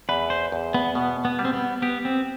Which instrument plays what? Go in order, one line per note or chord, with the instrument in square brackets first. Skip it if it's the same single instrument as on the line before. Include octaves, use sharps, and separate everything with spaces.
[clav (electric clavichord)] E2 [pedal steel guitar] B4
[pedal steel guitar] C5
[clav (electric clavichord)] E2
[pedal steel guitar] B3
[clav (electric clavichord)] B2 [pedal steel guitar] B3
[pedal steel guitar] B3
[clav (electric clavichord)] G3
[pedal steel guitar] C4
B3
[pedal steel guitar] B3 [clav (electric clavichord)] G4
[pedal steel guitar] C4